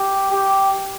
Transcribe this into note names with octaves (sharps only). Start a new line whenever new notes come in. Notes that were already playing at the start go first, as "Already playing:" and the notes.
Already playing: G4
G4